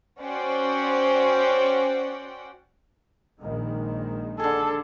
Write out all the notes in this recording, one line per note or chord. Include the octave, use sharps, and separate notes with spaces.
C#4 F#4 C5 D5 F#5 G5
A#1 D#3 G#3
D3 G#4 A4